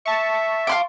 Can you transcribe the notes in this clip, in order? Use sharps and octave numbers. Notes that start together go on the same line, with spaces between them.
E5 A5 C#6
F5 C6 D6